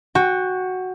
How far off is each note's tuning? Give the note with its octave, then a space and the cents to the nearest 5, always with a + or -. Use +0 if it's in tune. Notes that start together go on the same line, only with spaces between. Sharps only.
F#4 +0 G5 +25